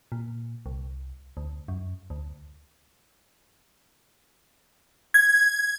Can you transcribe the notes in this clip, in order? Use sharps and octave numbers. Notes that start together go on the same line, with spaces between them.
A#2
C2
D2
F#2
D2
G#6